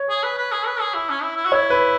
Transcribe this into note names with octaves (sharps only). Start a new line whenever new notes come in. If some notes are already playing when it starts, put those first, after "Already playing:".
Already playing: C#5
G#4
B4
B4
G#4
B4
G#4
E4
C#4
E4
E4
F#4
E4 C#5
B4